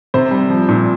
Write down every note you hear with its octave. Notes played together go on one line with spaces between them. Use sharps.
C3 C5
G3
F3
A#2